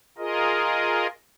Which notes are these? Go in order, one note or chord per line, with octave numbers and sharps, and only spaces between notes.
F4 G#4 A#4 D#5